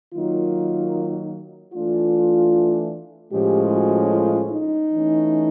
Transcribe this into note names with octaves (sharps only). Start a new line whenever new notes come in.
D#3 F#3 A#3 D#4 F4
E3 A3 D4 F4
A2 F3 G#3 C#4 G4
F#4
F4
D#4
E3 A3 C#4